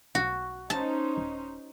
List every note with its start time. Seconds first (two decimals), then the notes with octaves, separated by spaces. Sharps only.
0.15 B1 F#4
0.70 C#4 D#4 C5 A5
1.17 D#1